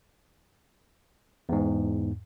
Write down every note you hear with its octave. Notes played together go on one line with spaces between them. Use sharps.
E2 G#2